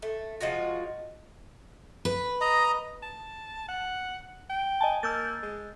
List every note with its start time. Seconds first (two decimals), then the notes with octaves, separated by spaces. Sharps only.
0.02 A3
0.41 F3 G#3 F4 F#4
2.05 B4
2.41 D#5 A#5
3.02 A5
3.68 F#5
4.49 G5
4.81 D#5 G#5 A5
5.03 A#3 E6 G6 A6
5.43 G#3